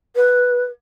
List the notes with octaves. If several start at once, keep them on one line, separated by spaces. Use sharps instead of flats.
B4